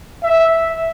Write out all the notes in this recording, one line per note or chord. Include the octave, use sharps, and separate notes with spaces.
E5